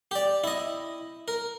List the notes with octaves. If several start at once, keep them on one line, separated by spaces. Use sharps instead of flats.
G4 D5
E4 D#5
A#4